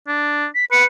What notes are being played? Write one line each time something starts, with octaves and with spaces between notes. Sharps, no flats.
D4
B6
B4 C#7